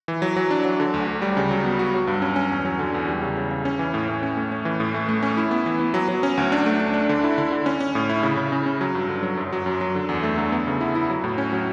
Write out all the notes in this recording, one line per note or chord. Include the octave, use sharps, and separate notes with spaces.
E3
F#3
F#3
D4
F#3
D3
D2
D3
G3
C#3
F#3
B3
F#4
F#3
G2
C#4
C#4
E2
F#3
D3
E2
G3
C#3
C#3
C#3
C#4
E3
A2
A2
C#4
A3
C#4
E3
A2
A3
A3
C#4
E4
B3
E3
B3
F#3
F#3
C#4
D2
D4
A3
D4
D4
D3
E4
D3
D3
C#4
C#4
A2
E4
C#3
C#3
C#3
C#4
F#3
G2
D3
F#3
F#2
F#3
F#2
F#3
D3
E2
A3
D3
B3
C#3
E4
E4
F#3
A2
C#4
F#3